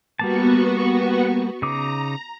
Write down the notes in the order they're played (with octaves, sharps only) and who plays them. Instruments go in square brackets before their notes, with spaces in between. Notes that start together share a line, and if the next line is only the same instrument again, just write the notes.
[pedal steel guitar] G3 A#3 A5 [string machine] B3 F#4 C#6
[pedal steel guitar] C#3 D#4 D6 [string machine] A#5